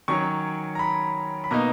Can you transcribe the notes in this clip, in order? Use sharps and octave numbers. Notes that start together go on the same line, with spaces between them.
D#3 F#3 C#4 C#6
A#5
B5
B5
B2 A#3 D#4 A#5